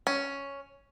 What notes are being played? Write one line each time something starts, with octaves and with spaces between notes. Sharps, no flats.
C#4